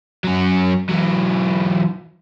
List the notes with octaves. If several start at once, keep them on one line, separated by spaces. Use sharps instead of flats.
F#3 C#4
E3 F#3